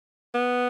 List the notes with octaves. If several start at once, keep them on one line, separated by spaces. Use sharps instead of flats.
B3